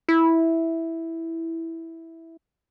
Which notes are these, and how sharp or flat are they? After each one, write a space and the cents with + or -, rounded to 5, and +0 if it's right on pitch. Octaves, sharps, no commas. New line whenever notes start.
E4 -5